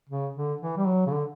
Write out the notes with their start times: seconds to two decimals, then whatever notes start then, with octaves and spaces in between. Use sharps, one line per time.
0.09 C#3
0.36 D3
0.61 E3
0.78 G3
0.86 F#3
1.07 C#3
1.12 D3